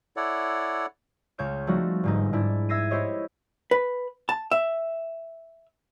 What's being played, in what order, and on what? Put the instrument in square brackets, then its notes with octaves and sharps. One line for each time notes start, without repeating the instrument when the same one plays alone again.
[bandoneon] E4 A4 C#5 D5 F#5
[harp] C#2 C#3 C#5 G6 E7
F3 G3 A3 C4 D#4 F#4
G1 G#2 D#4
G#2 D4 E4
E5 E6 G#6 A#6 C7 D#7
E4 G4 C5 C#5 D#5
[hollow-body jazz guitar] B4
A5
E5